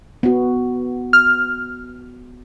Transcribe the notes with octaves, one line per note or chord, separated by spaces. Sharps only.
B3 F#4
F6